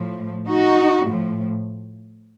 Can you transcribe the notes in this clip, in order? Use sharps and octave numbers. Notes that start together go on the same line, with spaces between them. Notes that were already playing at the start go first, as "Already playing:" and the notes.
Already playing: A2 F3
D#4 F#4
A2 F3